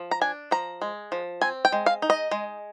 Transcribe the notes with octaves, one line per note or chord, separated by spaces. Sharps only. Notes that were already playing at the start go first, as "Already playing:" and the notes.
Already playing: F3
A#5
D4 G#5
F3 A#5
G#3
F3
C4 G#5
G5
G#3
F5
D#4
D#5
G#3